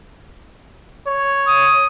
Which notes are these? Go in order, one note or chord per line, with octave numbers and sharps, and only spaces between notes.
C#5
D#6